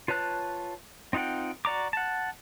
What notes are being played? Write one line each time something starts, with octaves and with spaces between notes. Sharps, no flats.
F4 B4 C#5 A5 F#6
C4 D#4 F4 F#5 G5
F#4 D5 A#5 D6
F#5 A5